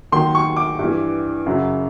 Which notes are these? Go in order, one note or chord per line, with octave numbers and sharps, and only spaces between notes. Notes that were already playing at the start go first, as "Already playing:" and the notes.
D#2 D#3 F#3 C6
C#6
D6
G2
E3
F#2 C#3 F#3